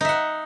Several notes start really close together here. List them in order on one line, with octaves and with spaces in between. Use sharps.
D#4 E5 F#5